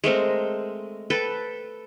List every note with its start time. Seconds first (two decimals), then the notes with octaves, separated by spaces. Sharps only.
0.04 G#3 A3 C4 A#4
1.10 A4 B4 G5